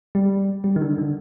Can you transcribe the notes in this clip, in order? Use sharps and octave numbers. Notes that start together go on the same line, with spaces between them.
G3
G3
D#3
D3
D3